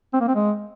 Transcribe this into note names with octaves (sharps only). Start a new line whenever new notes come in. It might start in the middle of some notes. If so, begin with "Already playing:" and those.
C4
A#3
C4
G#3